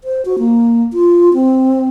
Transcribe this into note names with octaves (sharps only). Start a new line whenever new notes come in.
C5
F#4
A#3
F4
C4